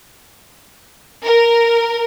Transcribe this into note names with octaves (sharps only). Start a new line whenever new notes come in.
A#4